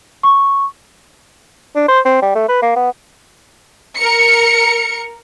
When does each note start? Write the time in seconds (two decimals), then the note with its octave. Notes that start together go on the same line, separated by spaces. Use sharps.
0.23 C#6
1.76 D4
1.88 C5
2.05 C4
2.22 G3
2.35 A3
2.48 B4
2.62 A#3
2.76 B3
3.96 A#4 C#7